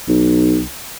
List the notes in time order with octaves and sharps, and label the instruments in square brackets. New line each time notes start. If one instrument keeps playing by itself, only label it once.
[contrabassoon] B1